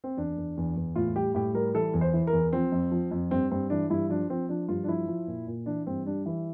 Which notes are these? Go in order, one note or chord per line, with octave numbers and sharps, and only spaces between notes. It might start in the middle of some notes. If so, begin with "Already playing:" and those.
C4
E2 D4
E2
E2
E2
A2 F4
G3 G4
A2 G4
G3 A#4
E3 A4
E2
C5
E3
A#4
E2
F3 C4
F2
F3
F2
G2 C4
G2 C4
E3 D4
G2 E4
F3 D4
F3 C4
F3 D4
G2 F4
D4
F3 E4
F3
A#2
A#2
E3 D4
G2 C4
G3 D4
E3 E4